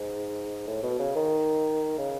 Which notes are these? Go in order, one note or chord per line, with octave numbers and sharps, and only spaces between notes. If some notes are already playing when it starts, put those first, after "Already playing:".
Already playing: G#2
A2
B2
C#3
D#3
C#3